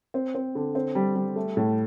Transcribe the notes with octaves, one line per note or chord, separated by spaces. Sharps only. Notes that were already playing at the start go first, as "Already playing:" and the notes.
C4
C4
D3
C4
G3
G3
A3
A2